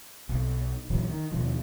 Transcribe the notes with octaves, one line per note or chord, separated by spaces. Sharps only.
B1
A#1 E2 F#3
D#3
D#2 B2 F3